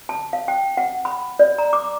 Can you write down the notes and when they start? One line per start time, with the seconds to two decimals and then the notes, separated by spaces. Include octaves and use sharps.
0.09 A5
0.33 F5
0.48 G5
0.77 F#5
1.05 B5
1.39 D5
1.58 A#5
1.73 D6